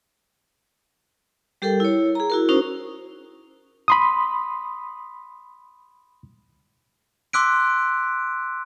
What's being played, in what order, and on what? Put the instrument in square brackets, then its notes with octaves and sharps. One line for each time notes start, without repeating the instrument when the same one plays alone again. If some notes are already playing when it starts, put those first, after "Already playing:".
[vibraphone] G3 G4 A4 A#4 G5
E4 C#5
G#4 A#5
E4 F#4 A#4
C#4 D#4 F#4 A#4 C5
[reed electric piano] B5 C6 D#6
[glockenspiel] C6 D6 E6 F#6 B6 D7